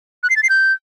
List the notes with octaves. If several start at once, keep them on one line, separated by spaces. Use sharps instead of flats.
F#6
C7
A6
C7
G6